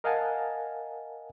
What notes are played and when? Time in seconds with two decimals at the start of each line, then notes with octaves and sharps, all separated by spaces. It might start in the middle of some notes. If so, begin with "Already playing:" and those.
0.04 A#4 D#5 F5 F#5 G#5 A5